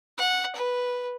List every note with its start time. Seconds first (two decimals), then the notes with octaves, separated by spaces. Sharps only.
0.18 F#5
0.55 B4